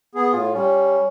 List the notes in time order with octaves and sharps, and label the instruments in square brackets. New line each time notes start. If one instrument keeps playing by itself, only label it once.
[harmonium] B3 G#4
[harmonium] A2 [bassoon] F4
[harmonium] G3 [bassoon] C#4